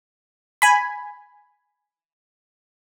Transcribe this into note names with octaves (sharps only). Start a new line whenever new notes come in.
G#5 B5